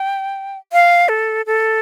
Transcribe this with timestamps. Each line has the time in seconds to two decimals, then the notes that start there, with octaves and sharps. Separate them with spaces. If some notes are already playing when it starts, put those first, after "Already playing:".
Already playing: G5
0.73 F5
1.09 A4
1.46 A4